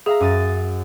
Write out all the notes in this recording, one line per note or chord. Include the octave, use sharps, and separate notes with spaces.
G#4 E5 F5 A#5
F#2 D#6 A6